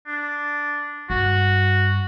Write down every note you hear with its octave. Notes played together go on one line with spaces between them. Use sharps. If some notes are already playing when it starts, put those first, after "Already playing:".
D4
G2 F#4